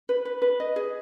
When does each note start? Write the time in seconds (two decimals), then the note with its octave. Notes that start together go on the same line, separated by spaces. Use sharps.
0.09 B4
0.25 B4
0.42 B4
0.60 D#5
0.76 G#4